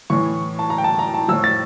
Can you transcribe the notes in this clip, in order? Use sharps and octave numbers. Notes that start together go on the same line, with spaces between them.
A2 E3 C#6
A5
A#5
G5
A5
A#5
A5
A2 F3 E6
A6